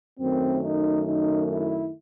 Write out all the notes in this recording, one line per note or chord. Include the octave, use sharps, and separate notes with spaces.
F#2 D#3 A3 C4
D#4
D#4
E4